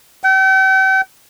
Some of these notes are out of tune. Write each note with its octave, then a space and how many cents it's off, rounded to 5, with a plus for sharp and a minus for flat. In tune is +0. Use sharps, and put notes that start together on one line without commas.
G5 -40